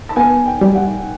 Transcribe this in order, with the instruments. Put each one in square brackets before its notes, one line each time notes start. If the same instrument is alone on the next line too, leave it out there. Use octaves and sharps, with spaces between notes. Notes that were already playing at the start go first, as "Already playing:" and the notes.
[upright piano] A5
[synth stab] B3 [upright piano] G#5
[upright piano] G5
[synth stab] G3
[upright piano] F#5